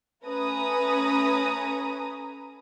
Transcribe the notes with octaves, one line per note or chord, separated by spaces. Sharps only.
A3 C#4 B4 G#5 A#5 D#6